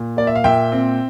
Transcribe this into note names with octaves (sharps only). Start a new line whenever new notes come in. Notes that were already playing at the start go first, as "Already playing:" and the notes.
Already playing: A#2
A#3 D5
E5
F5
A#2 E5 G5
C4